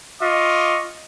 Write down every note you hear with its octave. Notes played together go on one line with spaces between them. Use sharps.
F4 D#5 C#6 D6